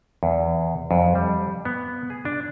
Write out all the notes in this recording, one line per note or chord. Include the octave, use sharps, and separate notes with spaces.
E2
F2
G3
B3
G#4
D4